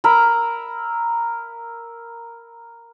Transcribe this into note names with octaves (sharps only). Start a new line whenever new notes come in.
A#4 E5 A#5 B5